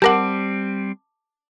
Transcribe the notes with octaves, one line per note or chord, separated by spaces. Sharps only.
G3 C4 G4 A#4 F#5 A5 D6